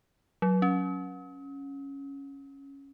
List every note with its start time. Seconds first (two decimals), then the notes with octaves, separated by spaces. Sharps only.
0.42 F#3
0.62 C#4